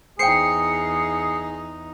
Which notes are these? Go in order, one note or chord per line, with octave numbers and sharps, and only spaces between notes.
E2 D#4 G#4 C5 G5 C7 C#7